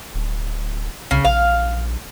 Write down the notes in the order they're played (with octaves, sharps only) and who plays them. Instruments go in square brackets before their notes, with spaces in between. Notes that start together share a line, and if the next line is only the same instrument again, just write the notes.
[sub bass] D1
[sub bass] C2 [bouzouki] C#3
[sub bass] A#1 [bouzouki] F5